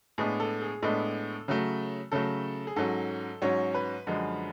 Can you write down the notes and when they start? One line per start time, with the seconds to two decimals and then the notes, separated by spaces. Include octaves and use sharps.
0.18 A2 G#3 B3 D4 G#4
0.40 A4
0.62 G#4
0.82 A2 G#3 B3 D4 A4
1.48 C#3 F#3 A3
2.12 C#3 F#3 A3 A4
2.67 G#4
2.76 G#2 F#3 C#4 A4
3.42 G#2 F#3 C#4 C#5
3.74 B4
4.07 F#2 D3 F3 G#3